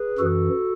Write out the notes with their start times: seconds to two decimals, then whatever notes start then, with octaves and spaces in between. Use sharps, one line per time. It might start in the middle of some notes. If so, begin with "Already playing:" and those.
Already playing: G#4 B4
0.19 F#2 E3 F#4 A4